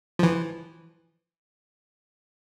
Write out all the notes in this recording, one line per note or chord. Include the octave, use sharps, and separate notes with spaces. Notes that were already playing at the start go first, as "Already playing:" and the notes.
E3 F3